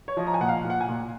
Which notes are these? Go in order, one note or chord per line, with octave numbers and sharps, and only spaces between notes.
C#5
F3 D#5
A#5
G#5
A#2 F#5
F5
A#2
F#5
G#5
A#2